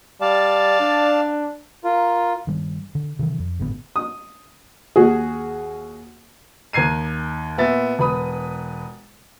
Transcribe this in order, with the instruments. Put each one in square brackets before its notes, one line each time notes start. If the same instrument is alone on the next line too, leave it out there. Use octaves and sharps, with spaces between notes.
[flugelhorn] G3 [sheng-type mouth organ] D5 F5 A5
[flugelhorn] D4
[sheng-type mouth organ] F4 [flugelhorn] A#4
[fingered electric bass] G2 D#3 G3
D3
C3 D#3 E3
F2
G#1 A2 D3 B3
[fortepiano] D#6
D#2 F#4 G#4
[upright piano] D#2 A#5 G#6 C7 D#7
A#2 B3 E5 A6
E1 B4 B5 D#6